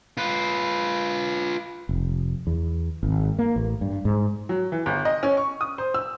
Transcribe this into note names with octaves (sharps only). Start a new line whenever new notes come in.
F4 B4
F1
E2
G#1
A#3
A1
G2
G#2
F#3
E3
G1
D#5
C#4
C#6
D#6
C5
E6